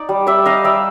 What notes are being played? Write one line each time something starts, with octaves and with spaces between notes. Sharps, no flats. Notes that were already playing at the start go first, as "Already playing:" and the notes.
Already playing: D#4 D5
G3
G3 D5 E5
D#4 D#5 F5
G3 D5 E5